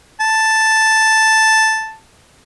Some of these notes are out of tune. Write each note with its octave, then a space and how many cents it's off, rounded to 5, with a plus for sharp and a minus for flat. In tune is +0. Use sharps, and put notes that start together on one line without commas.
A5 +0